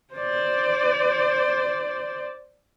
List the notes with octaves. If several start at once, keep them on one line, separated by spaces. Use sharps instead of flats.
C5 D5